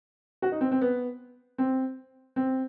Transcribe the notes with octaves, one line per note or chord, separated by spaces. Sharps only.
F#4
D#4
C4
C4
B3
C4
C4